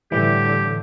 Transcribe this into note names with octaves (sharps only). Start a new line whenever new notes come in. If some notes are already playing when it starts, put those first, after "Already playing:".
A2 D3 E3 G3 G4